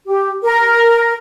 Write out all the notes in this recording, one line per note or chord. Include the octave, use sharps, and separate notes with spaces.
G4
A#4